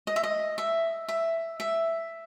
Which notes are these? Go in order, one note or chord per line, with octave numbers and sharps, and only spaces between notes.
D#5
E5
D#5
E5
E5
E5